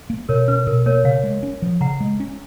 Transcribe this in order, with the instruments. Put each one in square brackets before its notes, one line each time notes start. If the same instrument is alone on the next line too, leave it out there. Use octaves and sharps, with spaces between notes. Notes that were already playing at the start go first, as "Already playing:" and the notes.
[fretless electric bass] A#3
[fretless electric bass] B2 [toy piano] A#4 C#5
[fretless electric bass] C#4 [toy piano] B4
[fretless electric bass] B2 [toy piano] A#4
[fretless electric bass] A#3 [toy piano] A#4 C#5
[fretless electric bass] C#3 [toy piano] C#5 F5
[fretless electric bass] G#3
C#4
F3
[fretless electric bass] C#3 [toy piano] F#5 A#5
[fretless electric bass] G#3
C#4